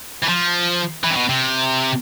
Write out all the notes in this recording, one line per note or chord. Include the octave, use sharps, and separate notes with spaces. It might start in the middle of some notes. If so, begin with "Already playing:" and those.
E3
F3
E3
C3
B2
C3